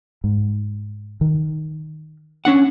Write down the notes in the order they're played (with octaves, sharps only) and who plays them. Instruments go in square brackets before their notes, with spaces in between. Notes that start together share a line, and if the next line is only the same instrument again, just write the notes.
[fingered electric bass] G#2
D#3
[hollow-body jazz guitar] C#4 D4 F#5